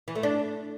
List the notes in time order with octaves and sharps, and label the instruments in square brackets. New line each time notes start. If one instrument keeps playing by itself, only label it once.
[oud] E3
A3
D4